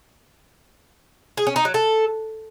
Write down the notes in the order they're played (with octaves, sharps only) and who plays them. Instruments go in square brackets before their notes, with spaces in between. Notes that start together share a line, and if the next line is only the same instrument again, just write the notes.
[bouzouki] G#4
C#4
D#4
F#3
A4